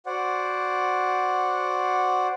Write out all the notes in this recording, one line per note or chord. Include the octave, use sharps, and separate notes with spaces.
F#4 C5 D5 F#5